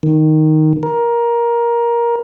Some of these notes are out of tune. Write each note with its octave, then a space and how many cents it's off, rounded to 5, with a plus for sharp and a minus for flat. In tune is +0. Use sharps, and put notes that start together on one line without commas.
D#3 +0
A#4 +15